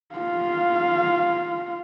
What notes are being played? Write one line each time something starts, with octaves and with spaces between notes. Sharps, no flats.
F4 F5